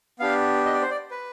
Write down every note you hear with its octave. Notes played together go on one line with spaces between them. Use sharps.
B3 D4 G4 F5
D#5
D5
C5
D5
B4